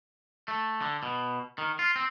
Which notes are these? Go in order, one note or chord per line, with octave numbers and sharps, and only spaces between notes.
A3
D3
B2
D#3
F4
C4